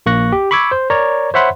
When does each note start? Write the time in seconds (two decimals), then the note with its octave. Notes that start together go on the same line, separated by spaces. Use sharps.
0.06 A#1 A#3 C#6 F#6 A#6
0.32 G4
0.51 B5 C#6 D6 E6 G#6
0.71 C5
0.90 A#4 C#5 D5 A#5
1.34 C5 C#5 E5 F#5 B5 C6